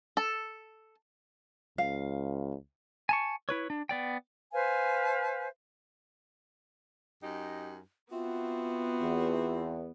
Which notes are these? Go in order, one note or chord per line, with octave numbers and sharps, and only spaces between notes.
A4
C#2 F5
G#5 A5 C#6
E4 B4 C#5
D4
B3 D5 G5
B4 C5 F5 G#5
F#2 D#4 G4
B3 C4 F4 F#4 E5
E2